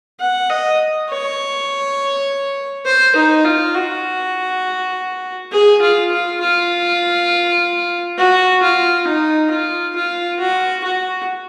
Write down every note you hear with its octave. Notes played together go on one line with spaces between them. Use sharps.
F#5
D#5
C#5
C5
D#4
F4
F#4
G#4
F4
F4
F4
F#4
F4
D#4
F4
F4
F#4
F#4